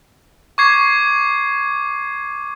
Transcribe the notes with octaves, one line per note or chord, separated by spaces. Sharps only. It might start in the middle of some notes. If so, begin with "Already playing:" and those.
C#6 D6 G#6 C7